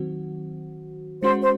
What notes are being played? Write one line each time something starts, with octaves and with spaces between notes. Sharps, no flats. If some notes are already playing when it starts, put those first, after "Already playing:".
Already playing: D#3 F#3 C4 F#4
G#3 C#4 F#4 C5
C5